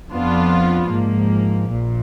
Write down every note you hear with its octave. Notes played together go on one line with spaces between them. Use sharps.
F2 F3 B3 D4 F4
G#2 F3 A#3
A#1 A#2